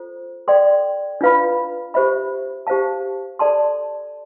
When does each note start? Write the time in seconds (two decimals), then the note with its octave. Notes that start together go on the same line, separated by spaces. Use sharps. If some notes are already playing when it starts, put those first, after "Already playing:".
Already playing: F4 A4 C5
0.48 A4 D5 G5 C6
1.21 D4 F4 B4 F5 B5
1.94 G4 C5 E5 B5
2.67 G4 C5 F5 A5
3.39 A4 D5 A5 C6